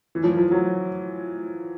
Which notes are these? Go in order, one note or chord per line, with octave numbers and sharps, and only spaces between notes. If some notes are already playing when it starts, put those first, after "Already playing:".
E3
F3
F3
F#3